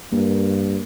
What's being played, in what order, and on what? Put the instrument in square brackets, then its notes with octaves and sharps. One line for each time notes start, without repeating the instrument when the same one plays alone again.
[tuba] G2 [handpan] A#3